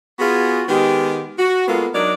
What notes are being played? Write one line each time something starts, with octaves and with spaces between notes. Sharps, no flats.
B3 F4 F#4 G#4
D#3 G#3 B3 G4
F#4
G#3 A#3 B3 F4 A4
F#3 D4 D#4 A#4 D5